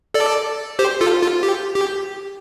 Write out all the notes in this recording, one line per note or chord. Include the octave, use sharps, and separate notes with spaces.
A4 D5
G4 C5
F4 A4
F4
G4
G4